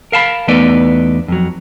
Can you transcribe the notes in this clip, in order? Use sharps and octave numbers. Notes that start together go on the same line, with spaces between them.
A#4 F5 A5 B5
E2 A3 B3 D#4 B4 D5
F2 F#3